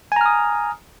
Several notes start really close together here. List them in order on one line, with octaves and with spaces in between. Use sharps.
G#5 A#5 F6 D#6